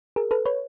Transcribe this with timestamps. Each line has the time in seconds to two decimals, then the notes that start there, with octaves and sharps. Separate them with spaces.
0.16 G#4 A#4
0.31 A4 B4
0.46 B4 C#5